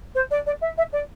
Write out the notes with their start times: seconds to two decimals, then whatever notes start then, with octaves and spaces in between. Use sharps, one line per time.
0.15 C5
0.31 D5
0.46 D5
0.61 E5
0.77 E5
0.92 D5